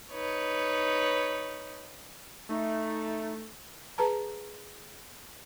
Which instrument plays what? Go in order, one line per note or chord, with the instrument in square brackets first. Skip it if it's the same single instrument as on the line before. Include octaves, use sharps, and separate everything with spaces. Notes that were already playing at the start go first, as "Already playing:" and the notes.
[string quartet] D#4 B4 C#5
[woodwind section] A3 [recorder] D#4
[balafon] G#4 B4 A5 A#5